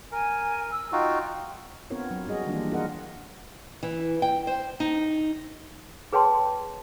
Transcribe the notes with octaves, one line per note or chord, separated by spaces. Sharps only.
A#4 G#5
E6
D#4 F4 F#4 G5
B3 C4 D4 F4 A#4 C#5
F#3
G3 F#4 G#4 D#5
D#3 E3 G3 A#3 D4 F4
F4 G#4 A#4 D#5 F#5
E3
G5
C5
D#4
G#4 B4 C#5 G5 A5 C6